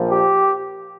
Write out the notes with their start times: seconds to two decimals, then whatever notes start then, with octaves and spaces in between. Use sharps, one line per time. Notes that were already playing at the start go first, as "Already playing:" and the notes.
Already playing: A#1 A#2 F3
0.10 G4